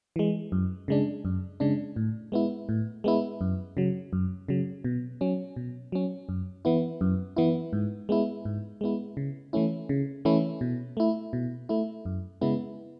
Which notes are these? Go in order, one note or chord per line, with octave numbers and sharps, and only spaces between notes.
E3 G#3
F#2
C#3 G#3 D4
F#2
C#3 G#3 D4
A2
G#3 B3 E4
A2
G#3 B3 E4
F#2
C#3 F#3
F#2
C#3 F#3
B2
F#3 C#4
B2
F#3 C#4
F#2
E3 B3 E4
F#2
E3 B3 E4
G#2
G#3 B3 E4
G#2
G#3 B3 E4
C#3
E3 A3 C#4 E4
C#3
E3 A3 C#4 E4
B2
A3 E4
B2
A3 E4
F#2
C#3 G#3 B3 E4